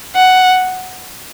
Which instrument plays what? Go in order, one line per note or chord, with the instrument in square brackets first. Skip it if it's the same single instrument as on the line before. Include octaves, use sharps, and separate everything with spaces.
[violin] F#5